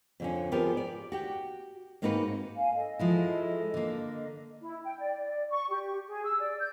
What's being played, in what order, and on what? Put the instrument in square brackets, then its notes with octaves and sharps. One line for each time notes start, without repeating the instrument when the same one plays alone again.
[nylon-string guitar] F2 D3 C#4
F3 B3 G4 G#4 A#4
D5
F#4 G4 G5
G#2 A#3 C4 D#4 F#4 B4
[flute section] F5 G#5
A4 D#5
[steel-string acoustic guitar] F3 G#3 E4
D3 A#3
[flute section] E4
G5
D5
D5
C#6
G4
G#4
E6
D5
G6